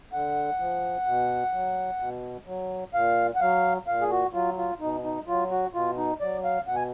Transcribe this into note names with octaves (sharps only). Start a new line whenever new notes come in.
D3 F#5
F3
B2
F#3
B2
F#3
A#2 F5
F#5
F#3 F5
A#2 F5
G#4
F#4
F#3 F4
F4
B2 D#4
D#4
F#3 F4
F#4
B2 F4
D#4
F#3 D5
F5
B2 F#5
G#5